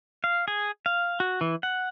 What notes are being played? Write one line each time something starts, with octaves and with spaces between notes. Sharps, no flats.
F5
G#4
F5
F#4
E3
F#5